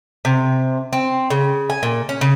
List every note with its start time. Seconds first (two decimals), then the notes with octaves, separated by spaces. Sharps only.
0.25 C3
0.93 C4
1.30 C#3
1.70 G#5
1.83 A#2
2.09 C#4
2.21 C#3